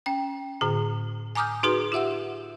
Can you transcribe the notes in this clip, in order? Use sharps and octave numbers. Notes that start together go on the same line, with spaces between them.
C#4 G5
A2 D3 G#4
G#5 A#5 D6 D#6 F6 G6
D#4 F#4 G#4 B4
F4 G4 E5 F#5 E6